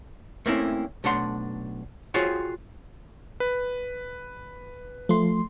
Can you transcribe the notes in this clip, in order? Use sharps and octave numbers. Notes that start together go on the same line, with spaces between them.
A3 A#3 C4 C#4 E4
B1 A3 D4 F#5 C6
F4 F#4 G#4 C5 C#5 G5
B4
F3 A3 C6